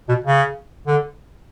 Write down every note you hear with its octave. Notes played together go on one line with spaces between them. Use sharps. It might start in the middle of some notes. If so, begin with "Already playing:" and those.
B2
C#3
D3